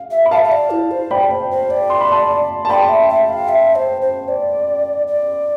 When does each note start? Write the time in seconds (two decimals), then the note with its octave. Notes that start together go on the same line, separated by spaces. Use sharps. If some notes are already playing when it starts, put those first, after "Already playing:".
Already playing: F5
0.11 E5
0.26 B5
0.31 E5 F5 A5
0.44 E5
0.52 D5
0.71 E4
0.91 C5
1.11 D5 G5 B5
1.31 C5
1.51 C5
1.70 D5
1.90 C6
2.01 B5
2.12 A5 C6
2.65 A5
2.69 D5 G5 B5
2.89 E5
3.09 E5
3.28 F5
3.49 E5
3.76 C5
4.02 C5
4.28 D5
5.07 D5